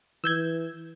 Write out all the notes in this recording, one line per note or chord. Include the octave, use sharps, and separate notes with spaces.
E3 E6 G6 G#6